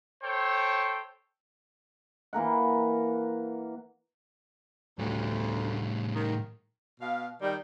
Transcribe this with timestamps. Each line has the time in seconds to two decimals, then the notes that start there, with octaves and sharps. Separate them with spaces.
0.22 A4 C5 C#5 G5
2.33 E3 A#3 A#4 F#5
4.99 D2 A2 G3
6.15 D#3
7.01 B2 F5
7.41 D#3 G3